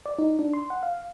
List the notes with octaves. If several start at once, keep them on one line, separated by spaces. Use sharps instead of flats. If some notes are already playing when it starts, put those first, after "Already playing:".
D5
D#4
D4
C6
F#5
F5